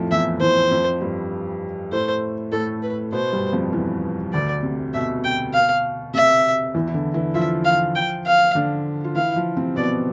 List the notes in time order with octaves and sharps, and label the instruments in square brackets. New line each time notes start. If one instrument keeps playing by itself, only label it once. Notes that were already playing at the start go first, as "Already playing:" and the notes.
Already playing: [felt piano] F2 A2 F3 A3
[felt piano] E2 E3 [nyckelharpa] E5
[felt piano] E2 E3 [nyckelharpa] C5
[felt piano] F2 F3
G2 G3
[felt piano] A2 A3 [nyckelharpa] C5
[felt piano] A2 A3 [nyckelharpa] A4
[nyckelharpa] B4
[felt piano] B2 B3 [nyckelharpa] C5
[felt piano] G2 G3
F2 F3
E2 E3
[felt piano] D2 D3 [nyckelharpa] D5
[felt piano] C3
[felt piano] B2 [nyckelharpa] E5
[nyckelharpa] G5
F5
[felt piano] C3 [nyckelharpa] E5
[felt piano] E2 E3
E4
D3 D4
E3 E4
[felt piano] F3 F4 [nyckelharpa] E5
[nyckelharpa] F5
G5
F5
[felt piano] D3 D4
F4
[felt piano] E3 E4 [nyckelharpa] F5
[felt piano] F3 F4
C3 C4
[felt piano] B2 B3 [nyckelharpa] D5